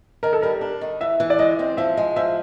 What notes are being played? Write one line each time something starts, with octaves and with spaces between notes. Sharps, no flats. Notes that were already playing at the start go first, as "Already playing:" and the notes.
D#3 A#4
A4
G3 A#4
D4
D#3
E3 E5
E3
D5
G#3 D#5
C4
F3 E5
G#3
F3 E5